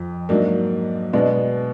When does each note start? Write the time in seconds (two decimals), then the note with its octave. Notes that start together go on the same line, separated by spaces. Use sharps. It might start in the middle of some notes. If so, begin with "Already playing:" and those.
Already playing: F2 F3
0.29 G#2 F#3 A#3 D4
1.13 B2 G#3 B3 D4